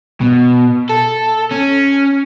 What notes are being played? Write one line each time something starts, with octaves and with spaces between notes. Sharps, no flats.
B2
A4
C#4